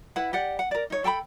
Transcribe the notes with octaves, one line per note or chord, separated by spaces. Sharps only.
E4 B4 F#5
G4 D5 F#5
F#5
A#4 D5
D#4 C#5
A4 G5 A5 B5